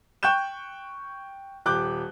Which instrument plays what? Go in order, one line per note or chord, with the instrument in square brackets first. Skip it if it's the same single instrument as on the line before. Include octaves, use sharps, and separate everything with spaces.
[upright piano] G5 C#6 F#6 G6 E7
D#1 G4 D6 F#6 G6